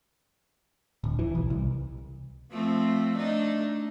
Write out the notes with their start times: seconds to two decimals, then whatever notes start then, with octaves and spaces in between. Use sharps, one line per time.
1.04 D1
1.19 E3
1.35 B1
1.50 C2
2.52 F3 A3 C4
3.17 A3 D4 D#4